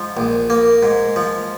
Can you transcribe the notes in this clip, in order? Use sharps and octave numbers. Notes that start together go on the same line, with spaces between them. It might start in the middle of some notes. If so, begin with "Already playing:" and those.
Already playing: G#2 F3
A#1
A#3
G#2
F3